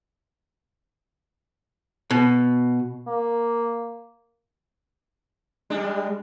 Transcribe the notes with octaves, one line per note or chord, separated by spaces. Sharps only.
B2
A#3
G3 G#3 D4